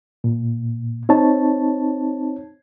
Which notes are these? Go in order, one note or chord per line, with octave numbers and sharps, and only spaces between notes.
A#2
C4 D#4 C#5 A5